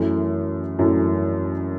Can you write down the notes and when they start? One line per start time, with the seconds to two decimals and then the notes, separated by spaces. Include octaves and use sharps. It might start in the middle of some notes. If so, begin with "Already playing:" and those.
Already playing: F#2 E3 A3
0.79 F#2 E3 A3